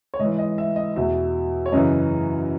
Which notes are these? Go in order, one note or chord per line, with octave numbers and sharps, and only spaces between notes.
C#5
G#2 E3 D#5
D#5
E5
D#5
E2 B2 E5
C#5
F#2 C#3 E3 D#5